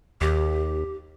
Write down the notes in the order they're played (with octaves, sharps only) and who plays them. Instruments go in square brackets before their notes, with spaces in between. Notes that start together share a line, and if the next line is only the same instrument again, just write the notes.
[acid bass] D#2 [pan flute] G4